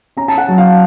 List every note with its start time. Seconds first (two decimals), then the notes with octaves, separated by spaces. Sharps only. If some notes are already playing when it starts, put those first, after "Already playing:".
0.17 C#4 A#5
0.28 A5
0.38 F#5
0.48 F#3
0.58 F5